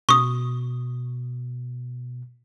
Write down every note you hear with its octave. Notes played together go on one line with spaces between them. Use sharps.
B2 C#6 D#6